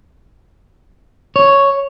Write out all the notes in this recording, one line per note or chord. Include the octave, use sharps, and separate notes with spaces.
C#5